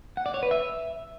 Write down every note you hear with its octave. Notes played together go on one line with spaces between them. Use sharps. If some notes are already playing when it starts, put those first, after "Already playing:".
F#5
D5
C#5
B4
E5